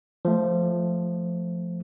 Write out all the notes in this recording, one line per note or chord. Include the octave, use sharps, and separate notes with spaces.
F3 A3